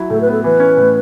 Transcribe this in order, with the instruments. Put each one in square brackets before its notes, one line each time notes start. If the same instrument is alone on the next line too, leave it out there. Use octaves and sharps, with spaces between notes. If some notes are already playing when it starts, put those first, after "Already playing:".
Already playing: [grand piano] F#3 E4
[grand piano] A2 [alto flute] A4
[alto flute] B4
[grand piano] B3
[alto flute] A4
[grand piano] E3 [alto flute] B4
[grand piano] C#4
A2